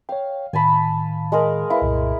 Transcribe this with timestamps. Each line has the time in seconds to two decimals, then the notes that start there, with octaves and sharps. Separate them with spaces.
0.09 C#5 F5 G5
0.53 A2 D#3 G#5 A5 B5
1.32 G#3 G#4 A#4
1.70 E4 B4 F5
1.82 C2 F#2 A#2